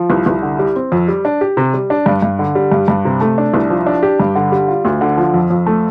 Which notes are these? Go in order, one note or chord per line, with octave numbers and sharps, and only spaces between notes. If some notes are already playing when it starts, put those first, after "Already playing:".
Already playing: F3
C2
C2
D3
G3
C4
F2
G3
D4
G4
C3
G3
D4
G2
G2
D3
G3
G2
G2
C3
A3
D4
C2
F3
D4
G4
G2
D3
G3
F4
D2
D3
F3
F2
F2
A3